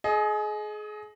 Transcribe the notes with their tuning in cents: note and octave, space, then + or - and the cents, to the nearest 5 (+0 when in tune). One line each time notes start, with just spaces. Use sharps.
G#4 +30 D#5 +0